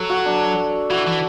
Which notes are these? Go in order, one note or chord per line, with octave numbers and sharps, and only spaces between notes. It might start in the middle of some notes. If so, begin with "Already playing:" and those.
Already playing: F#3 A4
F#4
D4
E3 F#4
E3